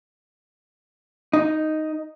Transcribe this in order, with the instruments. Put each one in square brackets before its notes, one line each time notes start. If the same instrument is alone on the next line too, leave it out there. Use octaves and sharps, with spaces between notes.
[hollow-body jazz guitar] D#4